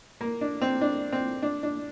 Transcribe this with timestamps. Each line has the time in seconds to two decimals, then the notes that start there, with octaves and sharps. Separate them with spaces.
0.21 A#3
0.41 D4
0.62 C4
0.81 D4
1.13 C4
1.43 D4
1.63 D4